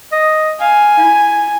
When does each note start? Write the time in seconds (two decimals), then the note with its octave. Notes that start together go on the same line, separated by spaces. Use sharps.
0.12 D#5
0.61 F5 G#5
0.98 E4